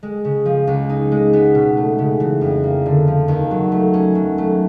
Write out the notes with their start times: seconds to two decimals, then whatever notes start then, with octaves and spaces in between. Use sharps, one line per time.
0.03 G#3
0.25 C#3
0.46 F3
0.67 C#2
0.89 D#4
1.12 G#3
1.33 B3
1.55 B2
1.77 A3
1.98 C#3
2.20 E3
2.41 F2
2.63 A#3
2.86 D3
3.07 F3
3.28 D#2
3.51 F#3
3.72 A3
3.94 C#4
4.15 F#3
4.38 A3